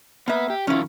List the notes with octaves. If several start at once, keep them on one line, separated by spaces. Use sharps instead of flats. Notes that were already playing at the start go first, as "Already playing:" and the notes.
A#3 B3 B4 E5
G4
F2 D#3 C#4 E4 F4